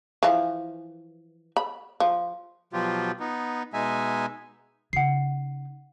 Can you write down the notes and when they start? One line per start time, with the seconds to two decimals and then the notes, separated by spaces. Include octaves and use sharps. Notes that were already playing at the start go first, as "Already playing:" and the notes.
0.23 E3 F3
1.57 B5
2.00 F3
2.73 B2 F3 F#3 F4 G4
3.20 B3 D#4
3.74 B2 G#3 D#4 E5 G#5
4.93 C#3 D#4 F#5 C7